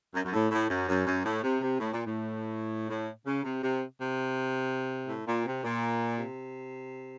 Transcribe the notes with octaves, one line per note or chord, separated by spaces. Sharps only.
F#2
F#2
A2
A2
F#2
F#2
F#2
A2
C3
C3
A2
A#2
A2
A2
C#3
C3
C3
C3
A2
A#2
C3
A#2
C3